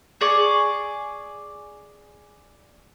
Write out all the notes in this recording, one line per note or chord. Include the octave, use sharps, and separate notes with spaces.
G#4 D5 C#6